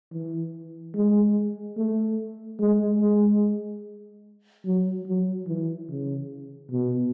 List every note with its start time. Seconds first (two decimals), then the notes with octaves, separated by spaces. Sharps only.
0.12 E3
0.95 G#3
1.77 A3
2.60 G#3
3.01 G#3
4.66 F#3
5.07 F#3
5.48 E3
5.89 C#3
6.71 B2